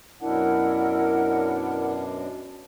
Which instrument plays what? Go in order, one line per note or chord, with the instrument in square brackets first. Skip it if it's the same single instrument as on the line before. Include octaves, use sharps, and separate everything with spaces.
[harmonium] F#2 B2 D4 [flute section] E4 A#4 F#5